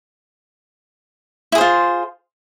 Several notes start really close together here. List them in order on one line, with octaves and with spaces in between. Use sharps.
E4 G#4 C5 F4